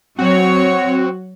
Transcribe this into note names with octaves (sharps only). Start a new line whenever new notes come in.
F#3 C4 F#4 C#5